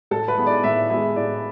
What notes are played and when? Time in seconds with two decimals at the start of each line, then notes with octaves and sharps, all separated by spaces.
0.11 A2 A4
0.28 B4
0.38 G#3 B3 E4
0.47 D5
0.64 A2 E5
0.89 G#3 B3 E4 E5
1.16 A2 D5